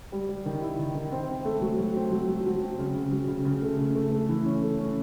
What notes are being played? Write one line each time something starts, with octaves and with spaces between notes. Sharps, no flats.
G3
G3
D#3
E4
D#3
D#3
C4
C4
A3
F#3
F#3
C4
F#3
F#3
F#3
C4
C#3
C#3
F#3
C#3
C#3
A3
C#3
A3
A3
E3
C#4
A3
C#4